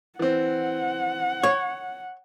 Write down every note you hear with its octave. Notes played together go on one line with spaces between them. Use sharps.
E3 C4 F#5
C#5